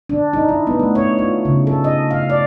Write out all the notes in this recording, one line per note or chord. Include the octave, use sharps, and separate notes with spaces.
D4
D#4
E4
B3
A3
C#5
F4
C#3
A4
D#5
F5
D5